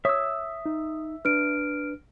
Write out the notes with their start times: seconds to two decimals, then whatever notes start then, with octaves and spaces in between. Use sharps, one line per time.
0.05 C#5 E5 D#6 E6
0.66 D#4
1.25 D4 B4 F6 D7